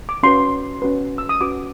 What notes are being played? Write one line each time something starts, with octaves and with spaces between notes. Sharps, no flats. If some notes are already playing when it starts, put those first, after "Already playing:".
D6
C#4 F#4 B4 C6
C#4 F#4 B4
E6
D#6
C#4 F#4 B4 D6